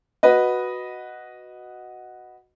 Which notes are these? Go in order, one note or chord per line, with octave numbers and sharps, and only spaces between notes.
F#4 B4 D#5